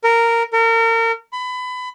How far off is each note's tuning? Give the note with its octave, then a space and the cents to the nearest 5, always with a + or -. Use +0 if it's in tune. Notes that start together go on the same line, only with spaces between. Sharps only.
A#4 -10
A#4 -35
B5 +25